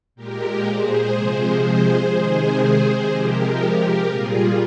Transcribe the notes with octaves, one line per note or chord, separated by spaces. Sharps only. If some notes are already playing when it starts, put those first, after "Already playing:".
A#2 G#3 G4 A#4
G#4 C5
C3 F3 G#3
G#4 C5
C3 D#3 G#3
G#4 C5
C3 F3 G#3 G4 A#4
A#2 G3 F4 G#4